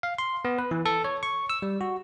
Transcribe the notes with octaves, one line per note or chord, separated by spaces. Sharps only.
F5
C6
B3
B4
E3
A4
C#5
C#6
E6
G3
F#4